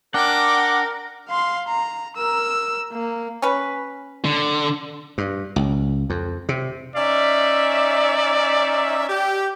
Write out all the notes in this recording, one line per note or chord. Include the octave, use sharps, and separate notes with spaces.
D4 A#4 F#5 G5 D6
F5 C6
A#5
A#4 E6
A#3
C#4 B4
D3
G2
C#2
F2
C3
C#4 D#4 D5 E5
G4